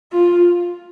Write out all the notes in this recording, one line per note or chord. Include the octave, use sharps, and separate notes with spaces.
F4